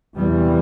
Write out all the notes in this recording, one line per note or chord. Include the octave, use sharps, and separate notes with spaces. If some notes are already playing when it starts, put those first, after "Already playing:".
E2 C3 E3 G3